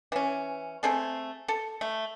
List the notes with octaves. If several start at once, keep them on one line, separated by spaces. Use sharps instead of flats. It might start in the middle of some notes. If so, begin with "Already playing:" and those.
E3 C#4
A3 C4 G#4 A4
A4
A3